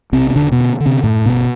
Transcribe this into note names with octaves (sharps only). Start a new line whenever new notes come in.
B1 C3 C4
C4
E1 D3 D4
B2 B3
D3
D3
C3 C4
F#2 A2 A3
G1 B2 B3